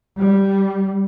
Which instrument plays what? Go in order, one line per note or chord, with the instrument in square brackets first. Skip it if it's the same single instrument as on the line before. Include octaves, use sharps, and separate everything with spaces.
[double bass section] G3